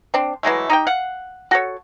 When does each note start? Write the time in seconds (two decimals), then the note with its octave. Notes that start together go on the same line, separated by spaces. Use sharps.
0.14 C4 D4
0.43 E3 F#3 G#3 A3
0.70 D#4 G4 G5
0.87 F5 F#5
1.51 F#4 A4 C#5